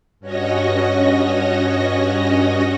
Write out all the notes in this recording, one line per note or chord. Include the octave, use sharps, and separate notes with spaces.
G2 C#4 F#4 C#5 D#5 A#6